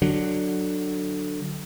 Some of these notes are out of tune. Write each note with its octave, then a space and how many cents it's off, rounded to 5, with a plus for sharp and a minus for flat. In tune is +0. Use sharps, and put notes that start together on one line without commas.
D3 +15 F#3 +10